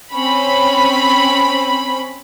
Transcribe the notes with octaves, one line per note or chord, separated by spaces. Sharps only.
C4 C#4 B5